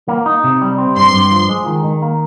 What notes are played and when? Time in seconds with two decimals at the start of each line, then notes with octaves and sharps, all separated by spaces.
0.08 A#3
0.26 D#4
0.44 C3
0.62 G3
0.78 C4
0.96 G2 C6
1.13 G2
1.31 F3
1.49 G#3
1.66 D#3
1.84 D#3
2.02 A#3